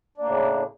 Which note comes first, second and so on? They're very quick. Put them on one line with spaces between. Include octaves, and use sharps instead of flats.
D4 A#3 A2 C#3